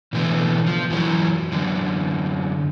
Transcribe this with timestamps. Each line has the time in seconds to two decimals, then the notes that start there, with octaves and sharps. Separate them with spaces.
0.13 B2 D3 E3 A3 B3
0.67 F3
0.90 F#2 E3 F#3
1.52 F#2 D3